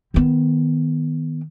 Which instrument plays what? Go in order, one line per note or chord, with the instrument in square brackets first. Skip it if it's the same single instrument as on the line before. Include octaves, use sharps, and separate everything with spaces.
[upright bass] D#3 B3